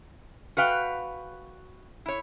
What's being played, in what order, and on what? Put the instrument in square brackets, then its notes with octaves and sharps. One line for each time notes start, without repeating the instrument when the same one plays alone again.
[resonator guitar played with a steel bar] F#4 B4 F5 G5
E4 C#5